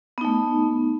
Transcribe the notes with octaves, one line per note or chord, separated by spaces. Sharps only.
A3 B3 D#4